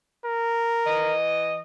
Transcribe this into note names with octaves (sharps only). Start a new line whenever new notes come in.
A#4
E3 D#5